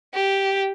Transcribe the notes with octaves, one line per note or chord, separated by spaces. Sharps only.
G4